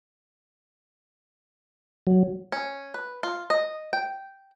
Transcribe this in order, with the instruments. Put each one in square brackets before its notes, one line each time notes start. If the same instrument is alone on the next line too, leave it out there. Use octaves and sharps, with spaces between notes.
[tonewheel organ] F#3
[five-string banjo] C#4
B4
F4
D#5
G5